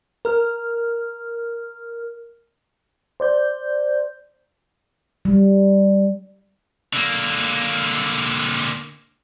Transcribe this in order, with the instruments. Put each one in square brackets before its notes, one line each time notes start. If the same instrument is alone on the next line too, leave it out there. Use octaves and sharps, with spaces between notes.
[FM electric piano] A#4 F6
C5 D5 G6
[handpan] G3
[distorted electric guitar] D3 A#3